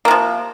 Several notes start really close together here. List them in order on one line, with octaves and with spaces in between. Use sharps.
A#3 C3 F3